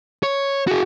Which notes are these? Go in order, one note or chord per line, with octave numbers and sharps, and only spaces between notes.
C#5
F#4 G#4